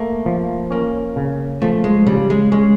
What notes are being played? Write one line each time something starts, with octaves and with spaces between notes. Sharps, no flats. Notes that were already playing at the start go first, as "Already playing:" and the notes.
Already playing: A3 A#3
F3
A#3 C#4
C#3
F3 A3
G#3
C#3 G3
G#3
G#3 C#4